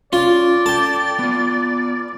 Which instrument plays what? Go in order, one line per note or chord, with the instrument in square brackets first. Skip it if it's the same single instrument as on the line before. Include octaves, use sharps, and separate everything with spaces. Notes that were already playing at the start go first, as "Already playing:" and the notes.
[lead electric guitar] C#4 [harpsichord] F4 [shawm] D5
[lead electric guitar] A4 G5 [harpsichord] A5
[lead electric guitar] B3 F4